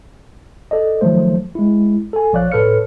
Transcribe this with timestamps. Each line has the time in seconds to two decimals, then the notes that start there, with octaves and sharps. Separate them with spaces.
0.71 A4 D5 D#5
1.01 D#3 F3 F#3 A3 C5
1.55 G#3 E4
2.13 A4 G#5
2.33 A#1 F3 C#5 D5 F5 F#6
2.52 A2 A4 B4 C#5 F6 C#7